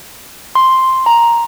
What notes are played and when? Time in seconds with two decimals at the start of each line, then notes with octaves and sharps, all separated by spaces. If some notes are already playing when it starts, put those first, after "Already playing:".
0.55 C6
1.06 A#5